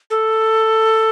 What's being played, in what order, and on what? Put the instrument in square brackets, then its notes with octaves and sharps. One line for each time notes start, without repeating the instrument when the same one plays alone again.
[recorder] A4